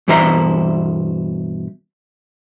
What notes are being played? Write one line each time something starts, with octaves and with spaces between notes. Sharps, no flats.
G2 B2 E3 C5 E5 A#5